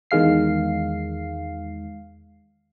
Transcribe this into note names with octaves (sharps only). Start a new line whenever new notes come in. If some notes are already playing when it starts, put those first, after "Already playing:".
E2 D#3 G#3 F5 C7